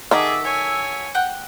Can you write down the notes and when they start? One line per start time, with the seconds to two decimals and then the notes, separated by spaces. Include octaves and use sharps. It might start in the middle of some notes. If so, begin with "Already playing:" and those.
0.11 D#3 F#4 G#4 A4 E5 A#5 D6
0.44 C#5 G#5
1.15 F#5 G5 F#6